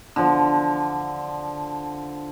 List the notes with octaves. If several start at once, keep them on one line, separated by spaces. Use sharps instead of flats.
D3 F3